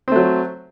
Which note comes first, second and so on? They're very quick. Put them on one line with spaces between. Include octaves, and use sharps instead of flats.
C4 A3 F#3